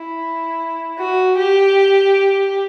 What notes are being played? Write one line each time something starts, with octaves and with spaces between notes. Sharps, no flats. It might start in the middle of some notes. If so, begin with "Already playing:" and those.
Already playing: E4
F#4
G4